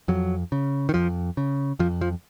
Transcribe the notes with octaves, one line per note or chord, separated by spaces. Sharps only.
F2 F#3
C#3
D#3
F2 F3
C#3
F2 F3
F3